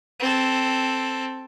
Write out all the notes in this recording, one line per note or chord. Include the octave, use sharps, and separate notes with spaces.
C4 A4